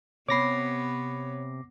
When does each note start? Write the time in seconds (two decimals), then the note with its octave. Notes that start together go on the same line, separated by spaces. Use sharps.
0.29 C3 B3 C#5 B5 D6 A#6 C7